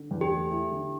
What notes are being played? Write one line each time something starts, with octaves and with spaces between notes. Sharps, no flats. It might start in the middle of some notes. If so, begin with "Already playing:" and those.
Already playing: D3
E2
G4
A3
E4
D3